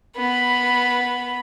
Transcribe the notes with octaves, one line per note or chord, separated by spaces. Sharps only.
B3 B5